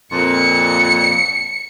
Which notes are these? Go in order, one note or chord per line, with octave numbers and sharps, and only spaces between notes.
F2 A#2 C#7